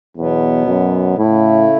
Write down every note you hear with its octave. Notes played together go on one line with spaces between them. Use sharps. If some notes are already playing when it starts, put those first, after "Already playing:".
E2 B2 F#3 B3
F#2
A2 C#3 A3 E4